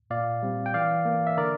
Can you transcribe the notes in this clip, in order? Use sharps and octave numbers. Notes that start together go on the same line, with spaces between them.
A#2 D5 F5
G3 C4
G5
E3 D5 F5
A#3
E5
D3 A#4 D5